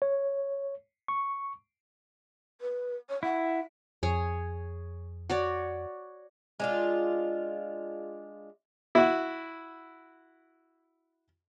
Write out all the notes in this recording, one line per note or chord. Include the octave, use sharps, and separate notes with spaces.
C#5
C#6
B4
C#5
E4 F#5
F2 G#4 C#5
F#4 C#5 D5
G#3 D4 F4
E4 F#4